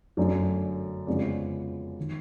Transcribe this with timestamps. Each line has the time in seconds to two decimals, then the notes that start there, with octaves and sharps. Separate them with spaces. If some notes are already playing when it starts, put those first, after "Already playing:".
0.17 G1 F#2 D3 F#3 A3 D5
1.07 F2 C#3 F3 G#3 B3 D5
2.00 D#3